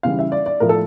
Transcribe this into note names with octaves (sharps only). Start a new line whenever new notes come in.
C#3 E3 G3 F5
E5
D5
D5
A2 F3 A3 A#4
A4